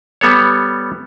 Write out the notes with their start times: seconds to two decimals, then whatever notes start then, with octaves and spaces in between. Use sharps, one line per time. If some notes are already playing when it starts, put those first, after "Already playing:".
0.21 G3 B3 A4 C#5